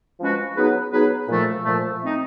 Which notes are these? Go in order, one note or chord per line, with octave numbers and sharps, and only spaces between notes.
F3 G#3 C#4 F#4 B4
F#3 B3 D#4 G#4 B4
F#3 B3 D#4 G#4 B4
A#2 F3 A3
A#2 F3 A3
A3 C4 D#4